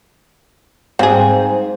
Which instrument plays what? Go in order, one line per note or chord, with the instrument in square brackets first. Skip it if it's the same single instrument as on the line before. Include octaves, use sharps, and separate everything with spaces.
[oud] G#2 [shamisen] C4 G#4 [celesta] C5 F5